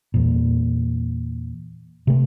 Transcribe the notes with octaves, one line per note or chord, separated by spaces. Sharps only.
E2 A#2
C3 A3